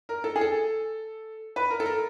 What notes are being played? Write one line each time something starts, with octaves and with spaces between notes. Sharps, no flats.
A#4
A4
G#4
A4
B4
A#4
A4
A#4